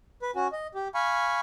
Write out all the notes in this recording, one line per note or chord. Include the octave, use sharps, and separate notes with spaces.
B4
C#4 F#4
D#5
G4
F5 G#5 B5 C#6